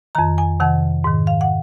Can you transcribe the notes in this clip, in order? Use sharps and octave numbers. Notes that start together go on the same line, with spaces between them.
F2 D#3 A#5
G#5
F2 C3 D#3 F#5
G#2 D#3
F5
F#5